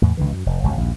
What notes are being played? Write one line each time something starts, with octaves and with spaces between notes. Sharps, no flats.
E2 A2
C#2 D3 E3
F#2
F1
G1 C#2 F#2
A#1 D#2